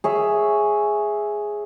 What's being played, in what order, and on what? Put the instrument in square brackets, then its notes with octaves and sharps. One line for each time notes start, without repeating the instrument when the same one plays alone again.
[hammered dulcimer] G#4 C#5 E5